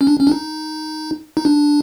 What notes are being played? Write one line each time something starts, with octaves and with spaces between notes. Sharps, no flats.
C#4
D4
C#4
D4
D#4
D#4
D4